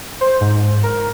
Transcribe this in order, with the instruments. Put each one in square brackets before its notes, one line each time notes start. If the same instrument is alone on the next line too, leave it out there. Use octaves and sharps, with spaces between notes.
[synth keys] C5
G#2
A#4